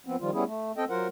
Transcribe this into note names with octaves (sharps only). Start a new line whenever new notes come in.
F3 B3 C4
D#3 F3 G3 F4
G3 B3 C#4 E4 G#4
A3
C4 A4 D#5 G5
F#3 F4 A#4 C5 F#5